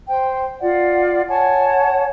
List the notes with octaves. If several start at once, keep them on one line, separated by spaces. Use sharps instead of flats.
C5 G5
F4 D5 F#5
C#5 F#5 G#5 A5